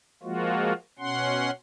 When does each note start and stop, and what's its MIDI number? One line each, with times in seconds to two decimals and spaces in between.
0.23 0.73 53
0.23 0.73 56
0.23 0.73 58
0.23 0.73 65
0.23 0.73 66
0.99 1.51 47
0.99 1.51 61
0.99 1.51 78
0.99 1.51 84